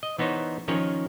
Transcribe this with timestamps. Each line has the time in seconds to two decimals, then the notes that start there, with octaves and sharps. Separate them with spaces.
0.03 D#5
0.18 E3 B3 D#4 C5 C#5
0.68 D#3 F3 C#4 A#4 C#5